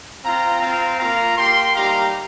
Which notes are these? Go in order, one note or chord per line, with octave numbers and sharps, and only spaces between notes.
C4 F4 F5 A#5
C4 F4 F5 A#5
A#3 F4 F5 A#5
A#3 G4 G5 C6
G3 A#3 D#4 G4 F5 A#5